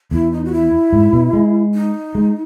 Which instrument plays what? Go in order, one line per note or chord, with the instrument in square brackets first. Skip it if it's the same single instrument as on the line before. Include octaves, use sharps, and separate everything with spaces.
[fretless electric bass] E2 [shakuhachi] E4
[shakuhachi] D#4
F#4
E4
[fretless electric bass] G#2
B2
G#3
[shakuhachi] D#4
[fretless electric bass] G#3